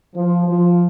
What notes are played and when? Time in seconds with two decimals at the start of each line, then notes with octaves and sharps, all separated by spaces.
0.15 F3
0.47 F3